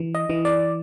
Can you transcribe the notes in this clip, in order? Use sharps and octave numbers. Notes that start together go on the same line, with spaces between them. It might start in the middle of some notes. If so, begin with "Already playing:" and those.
Already playing: E3
D#5
E3
D5